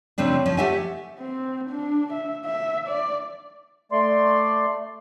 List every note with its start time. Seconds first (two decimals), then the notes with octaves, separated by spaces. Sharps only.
0.18 C#3 F3 A3 C4 D4
0.46 F3 C#4
0.57 A3 G4 E5 F#5 G#5
1.19 C4
1.70 D4
2.13 E5
2.45 E5
2.87 D5
3.92 A3 D5 C6